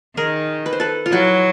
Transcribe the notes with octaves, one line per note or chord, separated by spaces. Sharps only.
D#3 G#4 A#4
B4
C5
A4 B4
F4
F#3 E4 F#4